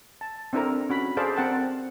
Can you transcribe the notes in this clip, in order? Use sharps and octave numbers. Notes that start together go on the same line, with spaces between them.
A5
C4 D4 E4 A4 A#4 A#5
C#4 F#4 B5
G#4 A4 C5 D5 F5 A5
C4 A#4 F#5 G5 A5